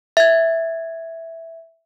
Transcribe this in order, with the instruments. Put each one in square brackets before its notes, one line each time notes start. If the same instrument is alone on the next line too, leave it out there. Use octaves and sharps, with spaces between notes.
[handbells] E5 G#6